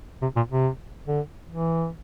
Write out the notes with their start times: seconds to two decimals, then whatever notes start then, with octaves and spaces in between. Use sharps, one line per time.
0.22 C3
0.36 A#2
0.51 C3
1.07 D3
1.50 E3